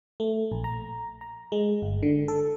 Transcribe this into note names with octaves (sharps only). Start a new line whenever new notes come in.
A3
A#1
A#5
A#5
G#3
G1
D3
A4